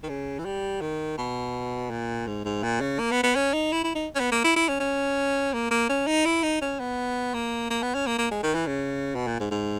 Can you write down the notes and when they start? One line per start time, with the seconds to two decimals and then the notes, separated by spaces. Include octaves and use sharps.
0.04 D#3
0.09 C#3
0.39 E3
0.45 G3
0.81 D#3
1.18 B2
1.90 A#2
2.27 G#2
2.45 G#2
2.63 A#2
2.81 C#3
2.99 A#3
3.12 B3
3.23 B3
3.35 C#4
3.53 D#4
3.72 E4
3.84 E4
3.95 D#4
4.15 C#4
4.20 B3
4.32 A#3
4.44 E4
4.56 E4
4.69 C#4
4.80 C#4
5.54 A#3
5.71 A#3
5.89 C#4
6.07 D#4
6.25 E4
6.43 D#4
6.62 C#4
6.80 B3
7.34 A#3
7.70 A#3
7.83 B3
7.95 C#4
8.07 A#3
8.18 A#3
8.31 G#3
8.43 D#3
8.55 E3
8.67 C#3
9.15 B2
9.27 A#2
9.40 G#2
9.51 G#2